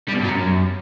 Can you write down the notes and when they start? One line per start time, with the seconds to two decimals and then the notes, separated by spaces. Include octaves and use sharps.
0.08 G3
0.13 B2
0.19 G2
0.24 F#3
0.29 F#2